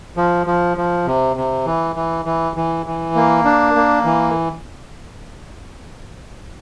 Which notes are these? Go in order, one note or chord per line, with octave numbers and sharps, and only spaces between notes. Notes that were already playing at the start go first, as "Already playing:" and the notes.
F3
F3
F3
C3
C3
E3
E3
E3
E3
E3
A#3
D4
A#3
E3